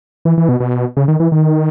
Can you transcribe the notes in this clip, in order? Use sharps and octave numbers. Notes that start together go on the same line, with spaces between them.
E3
E3
B2
B2
C#3
D#3
E3
D#3